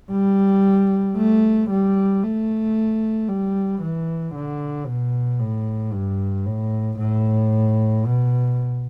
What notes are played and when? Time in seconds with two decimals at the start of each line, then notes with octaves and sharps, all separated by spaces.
0.11 G3
1.16 A3
1.70 G3
2.23 A3
3.29 G3
3.82 E3
4.35 D3
4.87 B2
5.40 A2
5.92 G2
6.46 A2
6.99 A2
8.05 B2